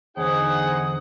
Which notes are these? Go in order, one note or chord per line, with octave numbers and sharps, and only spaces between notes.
E2 D3 D#4 G#4 C5 F#5 D#6